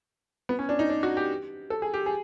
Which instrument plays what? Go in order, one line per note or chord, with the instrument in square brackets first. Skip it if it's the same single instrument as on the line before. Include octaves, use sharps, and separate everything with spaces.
[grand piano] B3
C#4
D4
D#4
D4
F#4
G4
A4
G#4
G4
G#4